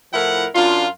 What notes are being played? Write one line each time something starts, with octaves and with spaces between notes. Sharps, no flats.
A2 F3 E4 A#4 F#5
F#2 D4 F4